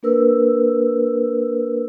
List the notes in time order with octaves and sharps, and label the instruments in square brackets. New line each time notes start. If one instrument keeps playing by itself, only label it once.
[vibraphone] A#3 D4 A#4 B4 E6